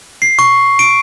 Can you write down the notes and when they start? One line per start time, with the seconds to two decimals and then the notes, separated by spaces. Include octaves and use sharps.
0.22 C7
0.39 C#6
0.79 D7